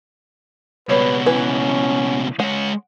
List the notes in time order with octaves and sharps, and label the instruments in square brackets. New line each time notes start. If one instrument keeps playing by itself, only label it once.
[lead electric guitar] C#2 B2 [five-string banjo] G3 C#5 [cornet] B4
[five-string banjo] E3 B4 [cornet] C#4
[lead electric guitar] G#3 C#5 [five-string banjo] F#5